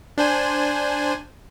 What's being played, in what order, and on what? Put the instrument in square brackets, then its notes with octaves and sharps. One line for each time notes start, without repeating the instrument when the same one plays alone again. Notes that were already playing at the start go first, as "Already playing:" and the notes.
[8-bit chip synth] D4 C5 G#5